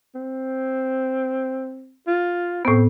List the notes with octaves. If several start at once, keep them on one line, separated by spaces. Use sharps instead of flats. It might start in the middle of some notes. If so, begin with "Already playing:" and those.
C4
F4
A2 B3 C4